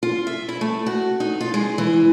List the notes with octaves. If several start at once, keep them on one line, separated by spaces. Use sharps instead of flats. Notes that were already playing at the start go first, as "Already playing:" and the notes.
F4
E5
E4
A3
F#4
D#4
F4
G#3
E3